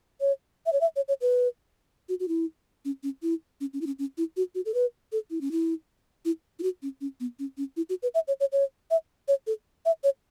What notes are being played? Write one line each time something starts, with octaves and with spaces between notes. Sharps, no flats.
C#5
E5
C#5
E5
C#5
C#5
B4
F#4
F#4
E4
C#4
C#4
E4
C#4
C#4
E4
C#4
C#4
E4
F#4
F#4
A4
B4
A4
E4
C#4
E4
E4
E4
F#4
C#4
C#4
B3
C#4
C#4
E4
F#4
B4
E5
C#5
C#5
C#5
E5
C#5
A4
E5
C#5